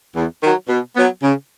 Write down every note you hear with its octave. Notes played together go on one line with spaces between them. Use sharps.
E2
D#3 F#3
B2
F#3 B3
C#3